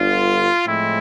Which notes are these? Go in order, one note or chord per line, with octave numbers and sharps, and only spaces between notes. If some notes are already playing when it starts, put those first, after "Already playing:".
Already playing: G1 G2 D3 F4
A2 F3 G#3 C4 E4